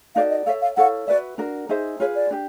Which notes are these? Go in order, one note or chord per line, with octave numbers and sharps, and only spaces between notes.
D#4 F#4 A4 D5 F5
D#5
A4 C#5 E5 F5
F5
E4 A4 C#5 F5 F#5
F#4 B4 D5 E5
D4 F#4 A#4
D#4 G#4 C5 E5
F4 G#4 B4 C#5
D5
D4 G4